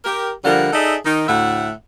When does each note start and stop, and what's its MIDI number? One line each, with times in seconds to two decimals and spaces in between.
0.05 0.31 67
0.05 0.31 70
0.43 0.68 50
0.43 0.68 53
0.43 0.68 55
0.43 0.68 70
0.43 0.68 78
0.73 0.96 63
0.73 0.96 68
0.73 0.96 69
0.73 0.96 74
0.73 0.96 76
1.05 1.24 51
1.05 1.24 63
1.27 1.71 38
1.27 1.71 45
1.27 1.71 76
1.27 1.71 78